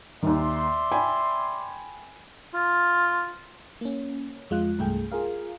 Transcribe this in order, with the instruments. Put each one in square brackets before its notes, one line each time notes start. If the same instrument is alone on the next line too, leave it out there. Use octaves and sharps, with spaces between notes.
[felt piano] D#2 D#3 [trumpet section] D5 E5 C6
[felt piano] G5 G#5 B5
[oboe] F4
[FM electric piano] A#3 C#4
F2 G#3 F4 F#6
C2 G2 A3 G#4 G5
F4 G#4 A#4 F5